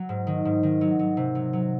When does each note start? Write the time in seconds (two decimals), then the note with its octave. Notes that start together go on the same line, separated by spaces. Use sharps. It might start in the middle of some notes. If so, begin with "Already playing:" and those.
Already playing: F#3
0.09 G#2
0.27 D#3
0.45 G#2
0.63 D#3
0.81 F#3
0.99 F#3
1.17 C3
1.35 F#3
1.53 F#3